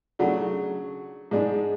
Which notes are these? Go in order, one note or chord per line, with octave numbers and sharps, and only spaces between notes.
C#3 F#3 A3 D4
G#2 G#3 D4 G#4